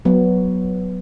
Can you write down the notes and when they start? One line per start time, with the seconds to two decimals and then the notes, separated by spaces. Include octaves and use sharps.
0.05 F#3 B3